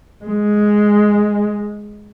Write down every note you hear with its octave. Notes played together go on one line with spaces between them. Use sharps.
G#3